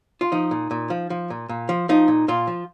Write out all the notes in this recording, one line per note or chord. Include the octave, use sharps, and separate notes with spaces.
F4
F3 D#4
A#2
A#2
F3
F3
A#2
A#2
F3
F3 D#4
A#2
A#2 F4
F3